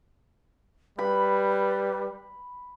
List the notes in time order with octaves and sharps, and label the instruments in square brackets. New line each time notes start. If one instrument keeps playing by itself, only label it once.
[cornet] G3 [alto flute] B4 [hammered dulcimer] B5